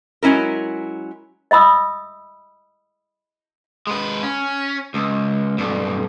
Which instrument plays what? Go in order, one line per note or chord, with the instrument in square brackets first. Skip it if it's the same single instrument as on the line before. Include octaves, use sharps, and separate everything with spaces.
[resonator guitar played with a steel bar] F#3 G#3 C#4 E4 A#4
[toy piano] D#5 E5 B5 D#6 E6
[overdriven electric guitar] G#3 B4
C#4
C#2
B1 G2